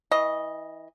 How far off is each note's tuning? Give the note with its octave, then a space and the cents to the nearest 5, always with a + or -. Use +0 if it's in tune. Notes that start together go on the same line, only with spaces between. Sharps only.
E3 -25 D#5 +0